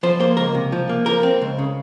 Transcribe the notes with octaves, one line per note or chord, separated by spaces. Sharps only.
F3 C5
A#3 C5
C#2 A#4
C3
F3
A#3
F3 A#4
C4
C#2
C#3